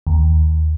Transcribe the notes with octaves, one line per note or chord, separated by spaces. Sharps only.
D#2